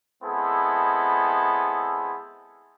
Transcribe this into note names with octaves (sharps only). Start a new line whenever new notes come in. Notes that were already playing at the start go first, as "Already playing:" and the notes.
G#3 B3 C4 E4 G#4 A4